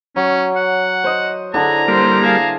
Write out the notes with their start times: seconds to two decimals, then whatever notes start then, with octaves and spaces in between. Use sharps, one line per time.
0.16 F#3 C#4
0.56 F#5
1.04 C5 D#5
1.54 D3 D4 E4 G#4 A#5
1.88 G3 A#3 C5
2.23 G#4 F5 A5